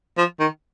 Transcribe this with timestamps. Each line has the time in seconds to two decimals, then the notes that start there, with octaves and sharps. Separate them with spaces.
0.18 F3
0.40 D#3